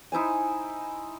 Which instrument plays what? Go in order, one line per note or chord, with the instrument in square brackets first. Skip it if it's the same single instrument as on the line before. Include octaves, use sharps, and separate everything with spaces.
[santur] D#4 E4 C5 G#5